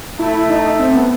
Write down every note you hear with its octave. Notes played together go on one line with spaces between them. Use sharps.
A3 E4
D#4
C4
B3